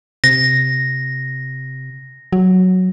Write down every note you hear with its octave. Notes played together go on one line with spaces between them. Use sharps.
C3 A#6
F#3